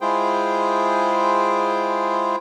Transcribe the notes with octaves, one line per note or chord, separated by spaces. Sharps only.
G#3 E4 F4 G#4 C5 G5